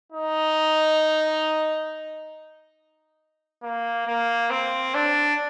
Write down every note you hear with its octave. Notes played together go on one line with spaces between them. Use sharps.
D#4
A#3
A#3
C4
D4